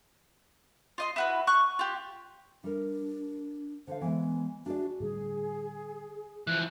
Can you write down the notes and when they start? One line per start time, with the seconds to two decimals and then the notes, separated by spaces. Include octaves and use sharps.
0.98 F4 D#5 C6
1.16 E4 F#4 B4
1.47 C#6 F#6
1.79 F4 G4
2.64 G3 D4 A#4
3.87 D3 C5 F5
4.01 E3 G#3 B3
4.66 D4 F#4 G#4 D5
5.00 A2 D3 G3 G#4
6.47 E3 F3 F#6